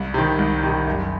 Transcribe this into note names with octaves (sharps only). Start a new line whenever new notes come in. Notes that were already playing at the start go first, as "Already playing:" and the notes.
Already playing: C2
C3 D#3
C2
C3 D#3
F#1